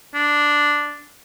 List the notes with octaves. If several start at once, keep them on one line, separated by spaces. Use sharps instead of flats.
D4